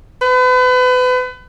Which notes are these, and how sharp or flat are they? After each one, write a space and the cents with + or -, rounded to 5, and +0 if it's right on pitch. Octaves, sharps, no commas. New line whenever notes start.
B4 +35